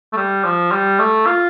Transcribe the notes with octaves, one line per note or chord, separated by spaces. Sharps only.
A3
G3
F3
G3
A3
F4